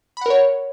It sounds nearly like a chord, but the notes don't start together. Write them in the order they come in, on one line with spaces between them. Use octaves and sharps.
B5 F#5 A#4 C#5